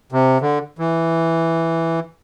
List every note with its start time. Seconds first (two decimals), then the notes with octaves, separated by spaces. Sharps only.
0.12 C3
0.41 D3
0.79 E3